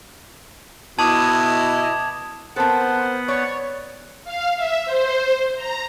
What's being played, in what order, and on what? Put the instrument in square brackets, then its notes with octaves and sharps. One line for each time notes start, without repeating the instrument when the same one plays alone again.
[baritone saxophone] B2 [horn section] E4 D#5 [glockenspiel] A5 F#7 [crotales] D6 D#6 G#6
[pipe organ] B3 F#5 [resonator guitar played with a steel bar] C4 A4 [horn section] A#4 C5
[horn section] C#5 [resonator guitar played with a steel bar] D5
[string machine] F5
E5
C5
A#5